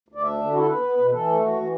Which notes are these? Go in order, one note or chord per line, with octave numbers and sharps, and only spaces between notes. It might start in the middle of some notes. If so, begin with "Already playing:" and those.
D2
D5
D4 E5
D3
E4 F#4
A4
B3 B4
B3
B2
E3 A4
A3
E3 F#4
E3